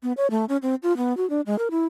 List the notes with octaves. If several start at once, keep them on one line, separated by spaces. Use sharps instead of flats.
B3
C#5
A3
C#4
C4
F4
B3
F#4
D4
G#3
A#4
E4